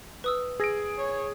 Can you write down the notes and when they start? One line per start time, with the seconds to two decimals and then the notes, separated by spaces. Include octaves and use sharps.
0.24 B4 D#6 E6
0.60 G#4 E6 G#6 A#6 D7
0.99 C#5